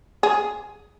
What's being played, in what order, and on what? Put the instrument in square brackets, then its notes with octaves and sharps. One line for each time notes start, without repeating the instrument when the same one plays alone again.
[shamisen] G#4